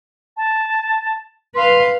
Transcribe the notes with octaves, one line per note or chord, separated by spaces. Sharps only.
A5
B4 F5 C6